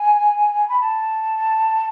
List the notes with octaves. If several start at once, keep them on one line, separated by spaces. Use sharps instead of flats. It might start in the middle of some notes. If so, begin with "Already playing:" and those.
Already playing: G#5
B5
A5